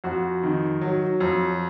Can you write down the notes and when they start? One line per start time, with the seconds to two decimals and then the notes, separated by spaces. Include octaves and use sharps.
0.04 F2 F#4
0.43 D#3
0.81 F#3
1.20 F2